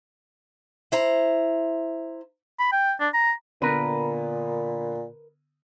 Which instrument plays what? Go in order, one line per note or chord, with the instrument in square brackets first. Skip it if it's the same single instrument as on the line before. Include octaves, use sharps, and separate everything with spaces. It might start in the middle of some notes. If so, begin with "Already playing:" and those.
[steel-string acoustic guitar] E4 C5 A#5
[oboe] B5
G5
D4
A#5
[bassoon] A#2 [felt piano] D3 B3 D#7 [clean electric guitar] A#4 B4